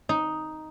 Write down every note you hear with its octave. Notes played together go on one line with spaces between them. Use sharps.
D#4